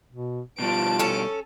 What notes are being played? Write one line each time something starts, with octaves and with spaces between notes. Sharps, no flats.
B2
B2 G3 F4 A5 D7
C#4 A4